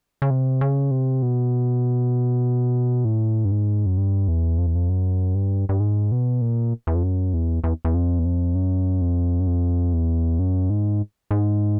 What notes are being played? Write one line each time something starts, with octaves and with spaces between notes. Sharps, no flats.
C#3
C3
C#3
C3
B2
A2
G2
G#2
F#2
G2
E2
F2
E2
F2
F#2
G2
G2
G#2
B2
A#2
E2
F2
F#2
E2
E2
E2
F2
E2
F2
F#2
F2
F#2
F2
E2
F#2
G#2
G#2